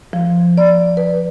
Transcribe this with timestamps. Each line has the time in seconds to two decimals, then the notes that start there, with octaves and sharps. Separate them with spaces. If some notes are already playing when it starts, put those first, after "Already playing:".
0.13 F3
0.57 D5
0.97 B4